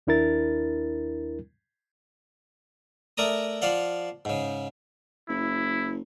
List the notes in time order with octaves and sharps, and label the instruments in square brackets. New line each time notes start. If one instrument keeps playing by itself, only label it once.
[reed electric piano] D#2 D4 E4 A#4 A6
[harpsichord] A3 A#4 D5 A#5 D#6
F3 D5 F5 F#5
G#2 C#3
[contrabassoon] F#1 [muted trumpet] E4